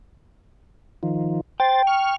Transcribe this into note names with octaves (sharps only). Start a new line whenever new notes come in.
D#3 F3
C5 G5 A6
C#6 F6